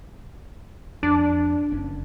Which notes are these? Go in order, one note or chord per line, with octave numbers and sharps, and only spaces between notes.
F2 D4
F#1 C#4